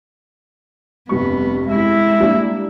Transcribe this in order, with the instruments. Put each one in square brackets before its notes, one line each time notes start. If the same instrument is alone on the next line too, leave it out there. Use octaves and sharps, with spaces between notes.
[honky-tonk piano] F1 G2 C#6 [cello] B3
[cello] G#3 E4 [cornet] E5
[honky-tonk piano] G3 A#3 D4